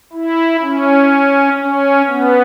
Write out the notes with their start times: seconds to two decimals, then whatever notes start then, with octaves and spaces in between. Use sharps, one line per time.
0.13 E4
0.62 C#4
1.58 C#4
2.07 B3